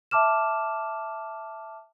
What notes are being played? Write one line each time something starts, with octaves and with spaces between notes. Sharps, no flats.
E5 A5 D6 F6 E7